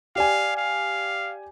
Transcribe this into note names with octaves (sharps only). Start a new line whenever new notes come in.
G4 D5 F5 G#5
F5